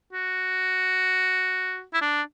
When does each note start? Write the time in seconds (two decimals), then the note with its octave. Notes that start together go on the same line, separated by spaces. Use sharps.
0.13 F#4
1.94 E4
2.01 D4